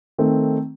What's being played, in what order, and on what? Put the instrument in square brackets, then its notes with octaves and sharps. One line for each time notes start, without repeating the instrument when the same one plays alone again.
[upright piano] D#3 A3 C4